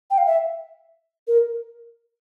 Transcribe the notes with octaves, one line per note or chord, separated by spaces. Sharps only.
G5
F5
E5
A#4